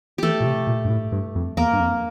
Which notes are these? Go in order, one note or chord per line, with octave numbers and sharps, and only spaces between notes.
E3 A3 G4 A4
A#2
C3
A#2
G2
A2
G2
F2
E2 A#3 A#4
G2
F2